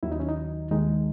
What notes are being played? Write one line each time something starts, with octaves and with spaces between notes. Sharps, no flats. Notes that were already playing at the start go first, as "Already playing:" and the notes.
D#2 D#3 F#3 E4
D#4
C#4
D#4
D#2 D#3 G#3 D#4